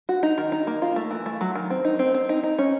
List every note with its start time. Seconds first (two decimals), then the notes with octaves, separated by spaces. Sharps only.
0.09 F#4
0.23 D#4
0.38 D#3
0.52 D#4
0.67 A#3
0.82 F4
0.96 A3
1.11 E3
1.26 A3
1.41 F#3
1.55 D#3
1.70 C4
1.85 D#4
1.99 C4
2.14 C4
2.29 D#4
2.44 D#4
2.58 C#4